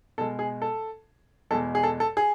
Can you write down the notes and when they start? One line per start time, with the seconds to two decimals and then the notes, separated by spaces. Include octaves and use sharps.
0.18 B2 G#3 A4
0.39 G#4
0.62 A4
1.51 E2 B2 G#3 A4
1.75 G#4
1.83 A4
2.00 A4
2.17 G#4